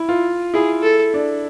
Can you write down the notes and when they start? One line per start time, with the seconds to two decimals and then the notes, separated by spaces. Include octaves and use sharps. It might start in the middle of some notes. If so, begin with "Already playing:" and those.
Already playing: E4
0.09 F4
0.54 E4 G#4
0.83 A4
1.14 D4